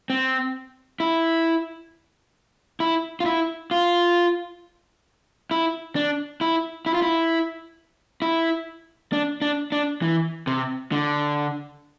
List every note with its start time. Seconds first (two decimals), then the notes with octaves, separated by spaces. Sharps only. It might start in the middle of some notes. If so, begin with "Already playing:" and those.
0.10 C4
1.00 E4
2.80 E4
3.20 F4
3.26 E4
3.71 F4
5.51 E4
5.96 D4
6.41 E4
6.86 E4
6.94 F4
7.02 E4
8.22 E4
9.13 D4
9.42 D4
9.72 D4
10.02 E3
10.47 C3
10.92 D3